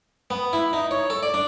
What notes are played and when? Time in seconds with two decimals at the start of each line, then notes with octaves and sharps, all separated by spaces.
0.30 B3
0.53 E4
0.73 D#4
0.91 C#5
1.10 A4
1.23 D5
1.34 D4